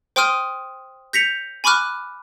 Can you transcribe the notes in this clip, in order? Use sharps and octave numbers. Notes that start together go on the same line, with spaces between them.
C5 G5 C6 D#6 F6 D#7
G6 A#6 B6 C#7 F7
G#5 B5 C#6 D6 F6 F#6